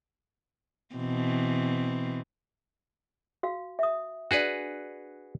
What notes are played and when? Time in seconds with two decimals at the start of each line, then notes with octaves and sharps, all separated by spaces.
0.95 B2 E3 C4
3.43 F#4 F5
3.79 E5 D#6
4.31 D4 F#4 G#4 B4 D5